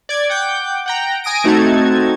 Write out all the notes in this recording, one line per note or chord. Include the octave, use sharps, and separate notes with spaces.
D5 G#6
F#5 G5 D6 G6
F#5 G5 A#5
G#5 D#6 A#6 D7
A3 C4 D#4 F#4 A5 G#6